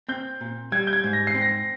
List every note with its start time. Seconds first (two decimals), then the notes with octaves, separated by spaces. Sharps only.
0.09 C4 G6
0.41 A#2
0.72 G3 G#6
0.87 G6
0.93 G#6
1.04 G#2
1.13 A#6
1.27 C7
1.34 C4
1.42 A#6